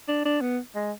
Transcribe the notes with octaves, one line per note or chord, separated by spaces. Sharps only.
D4
D4
B3
G#3